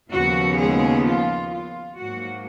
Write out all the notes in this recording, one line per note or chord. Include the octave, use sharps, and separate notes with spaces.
D#2 C#3 F3 B3 F#4
G#3 G#4
F4
F4
G#2 F#3 A#3 F#4